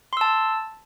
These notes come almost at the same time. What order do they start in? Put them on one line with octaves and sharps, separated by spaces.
C6 E6 A5